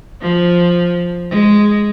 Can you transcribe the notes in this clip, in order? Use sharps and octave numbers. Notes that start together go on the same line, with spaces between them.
F3
G#3